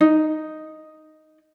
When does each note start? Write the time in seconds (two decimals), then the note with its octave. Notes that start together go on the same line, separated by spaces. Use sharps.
0.01 D#4